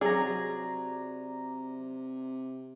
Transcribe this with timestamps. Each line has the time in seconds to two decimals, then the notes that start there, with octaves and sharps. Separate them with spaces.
0.01 C3 F#3 G#4 D5 A#5